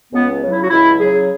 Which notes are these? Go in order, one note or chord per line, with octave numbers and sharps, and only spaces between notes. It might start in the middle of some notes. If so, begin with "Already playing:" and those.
C#2 B3
C#3 F#3
E4
F#4
C#2 E4
C#3 F#3 G#4